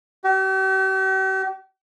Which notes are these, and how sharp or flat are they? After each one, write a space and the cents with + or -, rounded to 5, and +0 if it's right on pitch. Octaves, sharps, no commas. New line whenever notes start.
G4 -45